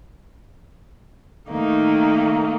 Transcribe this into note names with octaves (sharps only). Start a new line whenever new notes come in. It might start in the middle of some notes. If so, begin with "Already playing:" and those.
D#3 A3 A#3 D#4